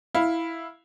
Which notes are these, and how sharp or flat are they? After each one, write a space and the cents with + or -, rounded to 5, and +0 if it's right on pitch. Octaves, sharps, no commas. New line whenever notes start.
E4 +0 F5 +0